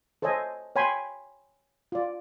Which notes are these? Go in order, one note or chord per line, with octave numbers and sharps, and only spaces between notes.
A4 C5 C#5 D#5 G#5
C#5 G5 G#5 B5 C6
F4 D5